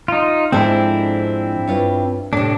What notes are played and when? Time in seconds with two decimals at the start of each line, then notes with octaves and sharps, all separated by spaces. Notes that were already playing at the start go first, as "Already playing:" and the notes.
0.08 D#4 F4
0.52 G#2 F3 C4 D4 E4 A4
1.67 G2 F4 C#5
2.33 A2 C3 D4